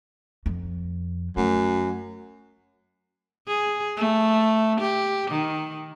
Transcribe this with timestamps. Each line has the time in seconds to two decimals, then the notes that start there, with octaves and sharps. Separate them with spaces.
0.46 F2
1.37 F#2 A3
3.48 G#4
3.97 A3
4.81 G4
5.31 D#3